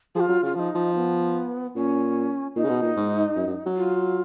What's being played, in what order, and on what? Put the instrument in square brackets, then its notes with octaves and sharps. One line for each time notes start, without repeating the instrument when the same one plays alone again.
[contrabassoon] F3 [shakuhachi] G#4
[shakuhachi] F4
[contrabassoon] F#3
[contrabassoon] C#3 [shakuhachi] F4
[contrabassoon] F3 [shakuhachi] D#4 F4
[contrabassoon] F3
[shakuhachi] B3
[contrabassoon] A#2 [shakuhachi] C#4
[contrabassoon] A#2 [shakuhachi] D#4
[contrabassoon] C#3
B2
A#2
G#2
F#2
F#2
F#3
[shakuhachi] F4